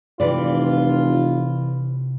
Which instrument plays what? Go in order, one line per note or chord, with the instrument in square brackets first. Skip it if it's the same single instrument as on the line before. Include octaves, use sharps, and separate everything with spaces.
[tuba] F1 [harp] C3 [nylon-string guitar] E3 B4 D5 [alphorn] F4